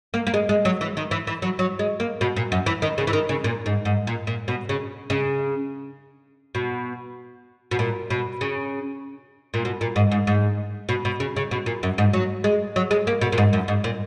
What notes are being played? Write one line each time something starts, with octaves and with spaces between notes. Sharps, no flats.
A#3
A#3
G#3
G#3
F#3
E3
D#3
E3
E3
F#3
F#3
G#3
A#3
B2
A#2
F#2
E3
D#3
C#3
E3
D#3
C#3
A#2
G#2
G#2
A#2
A#2
B2
C#3
C#3
B2
B2
A#2
B2
C#3
A#2
B2
A#2
G#2
G#2
G#2
B2
B2
C#3
C#3
B2
A#2
F#2
G#2
F#3
G#3
F#3
G#3
A#3
B2
A#2
G#2
F#2
G#2
A#2